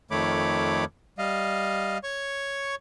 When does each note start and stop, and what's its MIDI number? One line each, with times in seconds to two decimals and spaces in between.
0.11 0.85 41
0.11 0.85 51
0.11 0.85 57
0.11 0.85 73
0.11 0.85 83
0.11 0.85 86
1.18 1.98 55
1.18 1.98 75
1.18 1.98 77
2.04 2.75 73
2.04 2.75 85